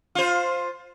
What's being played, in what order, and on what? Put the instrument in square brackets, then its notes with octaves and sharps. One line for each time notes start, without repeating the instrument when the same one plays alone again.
[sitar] F4 C5